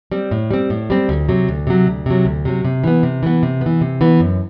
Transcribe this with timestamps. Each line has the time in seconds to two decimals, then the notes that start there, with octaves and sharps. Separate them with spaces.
0.12 G3 C4
0.31 A2
0.51 G3 C4
0.70 A2
0.90 G3 C4
1.09 D2
1.29 C3 F#3
1.48 D2
1.67 C3 F#3
1.87 D2
2.06 C3 F#3
2.25 D2
2.45 C3 F#3
2.65 C3
2.84 E3 B3
3.03 C3
3.23 E3 B3
3.43 C3
3.61 E3 B3
3.81 C3
4.01 E3 B3
4.20 F#2